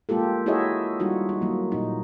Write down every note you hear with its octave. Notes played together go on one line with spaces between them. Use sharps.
G#3 A#3 F4 G4 A4
E4 F#4 G#4 C#5 D#5 E5
G3 D#4 F4 F#4
D#4
F#3 A#3
A#2 D#4